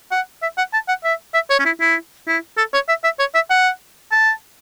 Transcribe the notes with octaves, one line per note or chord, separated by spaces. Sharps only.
F#5
E5
F#5
A5
F#5
E5
E5
C#5
C#4
E4
E4
E4
A4
C#5
E5
E5
C#5
E5
F#5
A5